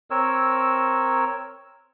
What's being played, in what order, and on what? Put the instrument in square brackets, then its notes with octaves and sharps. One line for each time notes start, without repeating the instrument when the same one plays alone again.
[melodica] C4 A#4 C#5 E6